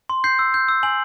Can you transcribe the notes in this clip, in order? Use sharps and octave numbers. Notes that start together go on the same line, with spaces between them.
C6
G6 C7
E6
G6
E6
G#5 F#7